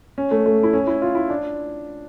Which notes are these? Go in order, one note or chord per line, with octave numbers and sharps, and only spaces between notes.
C#4
A3
A3
E4
C#4
E4
F4
E4
D4